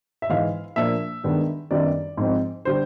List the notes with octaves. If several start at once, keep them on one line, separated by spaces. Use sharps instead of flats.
E5
G#2 E3 G#3 F5
A#2 F3 A#3 D4 E5
G2 D#3 G#3 B3 D4
F#2 D#3 G3 B3 D4 D5
G#2 F3 G#3 C4
D3 G3 C5